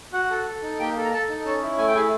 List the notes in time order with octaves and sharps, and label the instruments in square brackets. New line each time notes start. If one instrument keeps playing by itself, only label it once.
[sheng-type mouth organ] F#4 F#5
A4
A4
D#4
A#3 G4 G5
A4
A#5
A4 A5
D#4
C#4 A4 A5
E4
A3 G#5
G5
E4 G#4 G#5